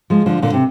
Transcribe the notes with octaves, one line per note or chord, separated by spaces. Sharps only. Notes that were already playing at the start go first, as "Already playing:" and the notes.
F3 G#3
D3 F3
A#2 D3
C3